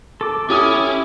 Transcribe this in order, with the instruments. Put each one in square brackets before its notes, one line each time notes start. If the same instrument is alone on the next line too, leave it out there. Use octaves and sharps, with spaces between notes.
[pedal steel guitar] A4 D6
[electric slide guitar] C#4 [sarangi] E4 [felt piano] G4 D#6